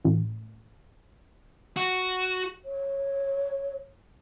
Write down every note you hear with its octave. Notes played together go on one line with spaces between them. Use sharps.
A1
F#4
C#5